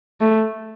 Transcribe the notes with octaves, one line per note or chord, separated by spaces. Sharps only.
A3